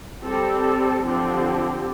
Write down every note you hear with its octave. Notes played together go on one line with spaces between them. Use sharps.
G3 C4 A4
D3 F3 C4 G4